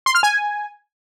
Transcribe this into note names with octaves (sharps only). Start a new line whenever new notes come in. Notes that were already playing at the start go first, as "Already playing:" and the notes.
C6
F6
G#5